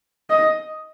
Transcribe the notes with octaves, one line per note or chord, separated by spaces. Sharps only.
D#5